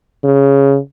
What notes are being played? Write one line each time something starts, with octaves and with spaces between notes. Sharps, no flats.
C#3